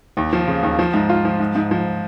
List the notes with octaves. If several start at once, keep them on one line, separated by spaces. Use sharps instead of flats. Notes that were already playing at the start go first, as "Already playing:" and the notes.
D#2
F3
C#3
D#2
F3
G#2
F4
F3
G#2
G#2
F3